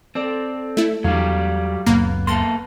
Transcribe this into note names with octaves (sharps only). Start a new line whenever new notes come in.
C4 A4 D5
A3 E4
E2 F#3 G3 D4 F5
F#1 C#2 F#3 A#3 B3
A#3 A4 C6 A6